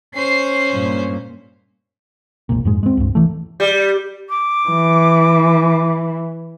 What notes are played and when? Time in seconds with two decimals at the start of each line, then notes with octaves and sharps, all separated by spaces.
0.15 C#4 C5 C7
0.70 G2 A#2
2.49 E1 A#1 A#2
2.65 F2 G#2 G#3
2.83 G#3 C4
2.97 C#2 G2
3.15 E3 A3
3.60 G3
4.30 D6
4.69 E3